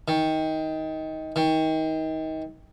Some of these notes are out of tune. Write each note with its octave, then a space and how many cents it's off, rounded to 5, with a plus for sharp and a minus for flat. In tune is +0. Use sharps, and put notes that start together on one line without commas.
D#3 +20
D#3 +30